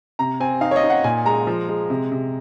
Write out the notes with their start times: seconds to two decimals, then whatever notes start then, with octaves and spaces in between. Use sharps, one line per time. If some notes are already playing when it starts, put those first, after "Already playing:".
0.19 C3 A#5
0.40 C4 G#5
0.61 D#4 F5
0.71 C#5
0.76 D#5
0.83 D#4
0.90 F#5
1.04 A#2 G#5
1.25 G#3 A#5
1.47 F3
1.69 G#3
1.90 C3
2.12 C3